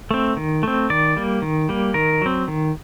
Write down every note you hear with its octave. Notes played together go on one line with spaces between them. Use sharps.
A3 C4
D#3
A3 C4
D#3 D5
G3 A#3
D#3
G3 A#3
D#3 A#4
F#3 C4
D#3